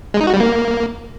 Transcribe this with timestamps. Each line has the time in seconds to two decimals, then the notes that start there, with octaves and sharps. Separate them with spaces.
0.14 G#3
0.21 D#4
0.27 F#4
0.34 G3
0.40 A#3